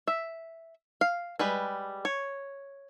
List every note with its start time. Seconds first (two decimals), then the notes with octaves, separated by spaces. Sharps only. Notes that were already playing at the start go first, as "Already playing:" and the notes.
0.07 E5
1.01 F5
1.39 G3 G#3 B4
2.05 C#5